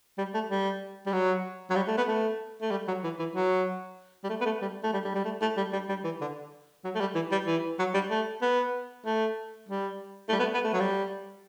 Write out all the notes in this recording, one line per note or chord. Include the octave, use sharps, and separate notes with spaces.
G3
A3
G3
G3
F#3
F#3
G3
A3
B3
A3
A3
G3
F#3
E3
E3
F#3
G3
A3
B3
A3
G3
A3
G3
G3
G3
A3
A3
G3
G3
G3
E3
D3
F#3
A3
G3
E3
G3
E3
F#3
G3
A3
B3
A3
G3
A3
G3
B3
A3
B3
A3
F#3
G3